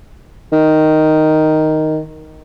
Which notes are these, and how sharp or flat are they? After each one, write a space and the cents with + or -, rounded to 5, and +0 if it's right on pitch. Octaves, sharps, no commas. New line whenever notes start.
D#3 +0